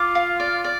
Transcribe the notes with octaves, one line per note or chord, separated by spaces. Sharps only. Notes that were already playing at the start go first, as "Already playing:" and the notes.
Already playing: F4 D6
F5
D5
D5